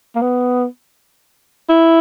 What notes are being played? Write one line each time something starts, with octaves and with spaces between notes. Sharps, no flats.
A#3
B3
E4